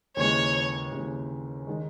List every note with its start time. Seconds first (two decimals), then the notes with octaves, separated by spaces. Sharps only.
0.17 D#2 C#3 E3 G#3 C#5
0.92 D#2 C#3 E3 G#3
1.67 D#3 G#3